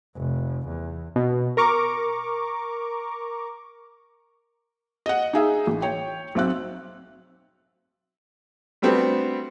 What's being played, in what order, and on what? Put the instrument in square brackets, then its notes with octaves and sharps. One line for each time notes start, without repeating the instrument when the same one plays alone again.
[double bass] F1
E2
[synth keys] B2
A#4 A#5 C#6 D6
[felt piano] D#5 F#5
D#4 G#4 E5
A1
C#5 G5
B1 C4 E5 F#6
[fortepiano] G3 A3 B3 C4 D4 F#4